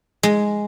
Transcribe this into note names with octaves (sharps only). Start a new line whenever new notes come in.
G#3